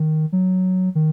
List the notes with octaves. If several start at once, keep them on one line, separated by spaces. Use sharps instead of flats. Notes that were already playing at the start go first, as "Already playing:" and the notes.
Already playing: D#3
F#3
D#3